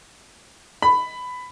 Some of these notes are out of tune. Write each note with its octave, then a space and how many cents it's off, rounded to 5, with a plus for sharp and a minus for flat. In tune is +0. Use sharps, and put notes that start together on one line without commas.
B5 +15